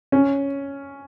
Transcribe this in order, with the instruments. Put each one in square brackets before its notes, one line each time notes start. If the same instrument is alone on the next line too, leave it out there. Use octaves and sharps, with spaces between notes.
[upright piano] C#4